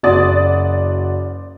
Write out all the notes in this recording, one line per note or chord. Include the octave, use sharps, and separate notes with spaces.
F#1 F#4 D5 D#6 A6